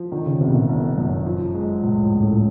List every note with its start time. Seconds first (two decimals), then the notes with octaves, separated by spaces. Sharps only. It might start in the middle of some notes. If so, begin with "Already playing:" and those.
Already playing: F3
0.12 D3 D#3
0.26 C#3
0.40 G1 C3
0.54 A#2
0.69 G1
0.97 F#2
1.26 F3
1.54 G#3
1.83 C#2 A#2
1.96 A2
2.10 G#2 C#3
2.23 A2